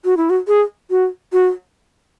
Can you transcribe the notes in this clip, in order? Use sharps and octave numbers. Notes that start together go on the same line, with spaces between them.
F#4
E4
F#4
G#4
F#4
F#4